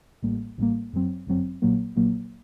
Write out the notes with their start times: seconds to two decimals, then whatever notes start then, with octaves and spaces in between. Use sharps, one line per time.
0.23 A1 A2 G3 A#3
0.58 A1 A2 G3 A#3
0.92 G1 F#2 F#3 C4
1.27 G1 F#2 F#3 C4
1.62 A#1 A#2 F#3 A#3
1.96 A#1 A#2 F#3 A#3